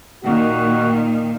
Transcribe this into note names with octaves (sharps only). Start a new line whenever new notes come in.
A#2 D#3 F#4